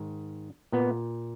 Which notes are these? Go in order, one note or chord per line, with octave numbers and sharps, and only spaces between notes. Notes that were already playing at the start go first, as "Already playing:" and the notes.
Already playing: G#2 D#3
A#2 B3